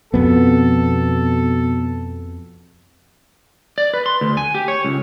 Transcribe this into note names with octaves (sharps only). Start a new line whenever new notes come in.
F2 B2 B3 A4
D5
B4
C6
D2
G#5
G4
C#5
C#2